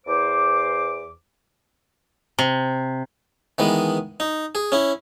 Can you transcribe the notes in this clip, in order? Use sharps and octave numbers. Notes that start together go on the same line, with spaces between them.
E2 C5 D6
C3
D#3 E3 G#3 B3
D#4
G#4
C#4 E4